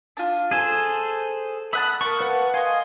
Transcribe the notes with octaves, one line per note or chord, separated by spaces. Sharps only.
D4 F4
G#4 A4 C5 G#5
E5 F#5 A5 B5 D#6
A#3 A5 C#6
B4 F#5
D#5 F5 G#5 C6